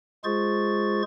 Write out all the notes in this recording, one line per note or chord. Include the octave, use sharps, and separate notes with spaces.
G#3 F4 G#4 C5 C#6 A6